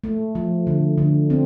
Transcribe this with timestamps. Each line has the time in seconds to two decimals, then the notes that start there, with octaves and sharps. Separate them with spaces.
0.04 A3
0.35 F3
0.67 D3
0.98 D3
1.30 C4